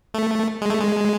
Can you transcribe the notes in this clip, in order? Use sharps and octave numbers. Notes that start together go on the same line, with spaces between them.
A3
G#3
A3
G#3